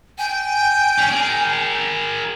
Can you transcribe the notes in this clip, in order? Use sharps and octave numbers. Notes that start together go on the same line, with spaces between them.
G5 G#5
C#4 D4
G#4 A#4